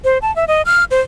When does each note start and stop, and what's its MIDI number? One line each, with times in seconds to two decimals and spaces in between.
0.04 0.18 72
0.22 0.34 81
0.36 0.45 76
0.48 0.62 75
0.66 0.84 89
0.91 1.01 72